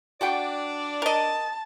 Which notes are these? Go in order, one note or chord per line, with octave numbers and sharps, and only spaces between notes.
D4 F#4 D5 F#5 G5
A#4 D#5 A5